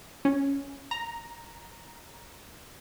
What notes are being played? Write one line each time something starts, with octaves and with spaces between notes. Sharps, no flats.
C#4
A#5